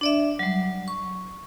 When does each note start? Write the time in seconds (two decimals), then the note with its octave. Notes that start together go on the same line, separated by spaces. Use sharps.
0.01 D4 D5 E5
0.39 F#3 G3
0.88 C#6